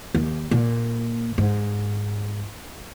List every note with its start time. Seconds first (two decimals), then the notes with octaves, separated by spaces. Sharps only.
0.15 D#2
0.51 A#2
1.38 G#2